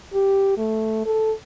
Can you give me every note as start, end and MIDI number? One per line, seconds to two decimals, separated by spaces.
0.14 0.52 67
0.57 1.03 57
1.05 1.32 69